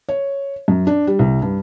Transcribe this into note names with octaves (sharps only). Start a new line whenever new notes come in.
C#5
F#2
D4
G3
C2
G2